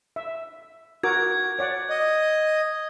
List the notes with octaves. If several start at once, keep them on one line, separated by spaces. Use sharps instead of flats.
E5
F#4 A#4 D6 G#6
C#5 D5 F#5
D#5